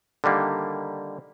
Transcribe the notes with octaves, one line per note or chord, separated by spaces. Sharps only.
D3 D#3 G3 A#3